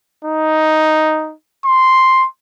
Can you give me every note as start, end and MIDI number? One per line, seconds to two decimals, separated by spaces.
0.25 1.33 63
1.65 2.26 84